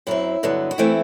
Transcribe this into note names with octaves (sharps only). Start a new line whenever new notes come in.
F#2 F#3 C4 E4
G2 D3 F#3 B3
F#4
E3 A3 C4 E4